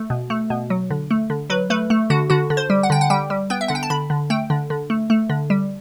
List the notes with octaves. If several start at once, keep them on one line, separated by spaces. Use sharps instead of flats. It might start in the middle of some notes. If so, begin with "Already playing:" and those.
Already playing: A3
B2
A3
B2
F#3
D3
A3
D3
F#3 B4
A3 B4
A3
D3 F#4
D3 F#4
D3
C5
G3
F#5
D3 G5
F#5
G3 G5
G3
B3 G5
E5
D3 F#5
G5
A5
D3 B5
D3
A3 G5
D3
D3
A3
A3
D3
G3